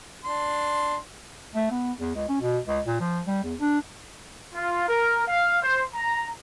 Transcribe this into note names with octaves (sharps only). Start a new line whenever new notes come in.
D4 C6
A3
B3
E2
C#2
C#4
B2
C#2
A#2
F3
G3
E2
D4
F4
A#4
F5
C5
A#5